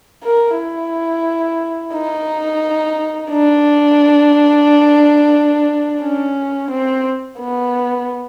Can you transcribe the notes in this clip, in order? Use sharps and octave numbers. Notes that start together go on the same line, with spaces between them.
A#4
E4
D#4
D4
C#4
C4
B3